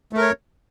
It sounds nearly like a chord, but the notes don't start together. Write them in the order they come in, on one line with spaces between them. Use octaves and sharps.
A3 A#4 C#5